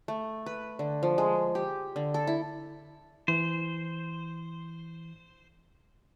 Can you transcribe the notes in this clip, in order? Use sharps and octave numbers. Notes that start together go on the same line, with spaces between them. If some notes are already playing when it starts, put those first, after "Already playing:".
A3
B4
D3
F3
G#3
G4
D3
A4
E4
E3 C5